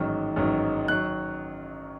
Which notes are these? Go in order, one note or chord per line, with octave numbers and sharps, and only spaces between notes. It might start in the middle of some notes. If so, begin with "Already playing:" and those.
Already playing: A1 G#2 D#3 F#3
A1 G#2 D#3 F#3
D#3 F#3 F#6